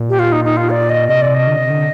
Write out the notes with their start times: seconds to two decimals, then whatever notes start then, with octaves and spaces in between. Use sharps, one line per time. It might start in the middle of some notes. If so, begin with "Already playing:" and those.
Already playing: A#2
0.09 G4
0.19 F4
0.32 D#4
0.45 D#4
0.57 F4
0.70 D5
0.90 D#5
1.08 C3 D#5
1.22 D5
1.35 D#5
1.47 D3
1.58 C3
1.70 D3